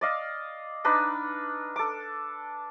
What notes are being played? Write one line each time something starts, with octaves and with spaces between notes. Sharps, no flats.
D5 D#5 F5
D4 D#4 B4
A4 D6